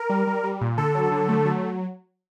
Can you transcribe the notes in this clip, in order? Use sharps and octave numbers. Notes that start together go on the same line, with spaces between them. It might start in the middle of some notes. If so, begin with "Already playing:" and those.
Already playing: A#4
G3
G3
G3
A#2
D3 A4
F#3
D3
A3
F#3